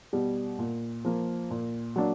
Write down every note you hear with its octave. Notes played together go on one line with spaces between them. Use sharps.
B2 G3
A#2
F3 A#3
A#2
F#3 A#3 D4